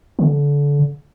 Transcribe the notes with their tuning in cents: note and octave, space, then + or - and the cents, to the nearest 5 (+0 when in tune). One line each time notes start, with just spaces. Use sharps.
D3 -30